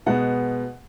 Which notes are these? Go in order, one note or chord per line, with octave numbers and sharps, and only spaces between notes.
B2 G#3 B3 F#5